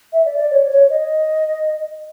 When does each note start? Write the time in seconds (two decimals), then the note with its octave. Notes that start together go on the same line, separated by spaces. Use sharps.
0.13 E5
0.25 D5
0.38 D5
0.51 C#5
0.70 C#5
0.90 D#5